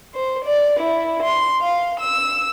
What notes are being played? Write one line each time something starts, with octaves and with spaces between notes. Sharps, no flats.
C5
D5
E4
C6
F5
E6